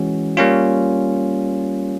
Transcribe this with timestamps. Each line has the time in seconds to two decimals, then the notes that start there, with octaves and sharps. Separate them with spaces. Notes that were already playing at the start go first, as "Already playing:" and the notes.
Already playing: E3 G#3 C#4 F#4
0.37 G3 A#3 C#4 F4